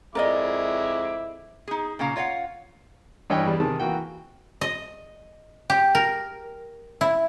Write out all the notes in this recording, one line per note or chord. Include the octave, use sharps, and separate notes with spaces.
F2 G#3 E4 A#4 D5 D#5 D6
D#4 G#4
A#2 C#3 C#4 F5 A#5
F4 C#5 D#5 F5 F#5
G2 E3 C#5 D#5 G5
E2 G3
C3 D#3 G#4 A5
E3 A#3 F#4 G5
D#5
G4
A#4
E4